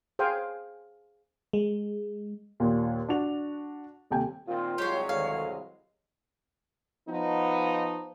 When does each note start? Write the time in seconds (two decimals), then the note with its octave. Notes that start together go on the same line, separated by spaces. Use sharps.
0.19 G#4 C5 F5 G5 G#5
1.53 G#3
2.60 D#2 A#2
3.09 D4 F#4 F7
4.10 D#1 C3 G5 G#5
4.48 A#2 D#3 C4 F4
4.78 C2 F#3 G#3 G4 C5 C#5
5.09 D2 G#2 D#3 F5
7.08 F3 B3 D#4